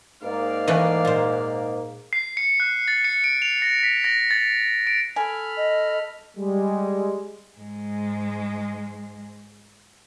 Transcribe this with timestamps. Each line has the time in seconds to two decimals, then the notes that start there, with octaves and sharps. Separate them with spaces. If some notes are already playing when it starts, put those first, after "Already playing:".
0.23 G#2 A#3 D5 F5
0.68 E3 A3 B4
1.05 A#2 C5
2.13 C7
2.37 C#7
2.60 F#6
2.88 A6
3.05 C#7
3.24 D7
3.42 F7
3.62 A#6
3.83 B6
4.04 A#6
4.31 A6
4.87 D7
5.16 A4 G#5 B5 F6
5.57 D#5
6.37 G3 G#3
7.58 G#2 G#3